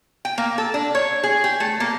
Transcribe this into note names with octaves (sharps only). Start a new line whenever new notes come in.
G5
A#3
A4
D4
C#5
G#4
G4
A3
A#3